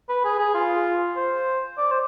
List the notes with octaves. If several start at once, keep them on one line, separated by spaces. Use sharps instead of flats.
B4
G#4
G#4
F4
C5
D5
C5